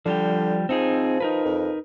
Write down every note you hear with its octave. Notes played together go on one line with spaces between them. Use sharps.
D3 F3 G3 G4
F3 C4 D#4 G#4
D#4 A#4 B4
F2